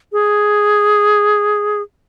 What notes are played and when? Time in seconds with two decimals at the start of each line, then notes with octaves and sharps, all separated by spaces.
0.12 G#4